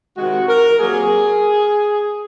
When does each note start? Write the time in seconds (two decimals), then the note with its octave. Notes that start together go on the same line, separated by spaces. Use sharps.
0.17 C3 D#3 G#3 F#4
0.48 A#4
0.79 C3 F#3 A#3 G#4